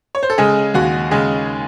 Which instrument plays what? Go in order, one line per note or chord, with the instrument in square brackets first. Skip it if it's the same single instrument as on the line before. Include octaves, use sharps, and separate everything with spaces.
[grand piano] C#5
C5
A4
C#3 G#3 G#4
D#2 F#4
C#3 G#3 G#4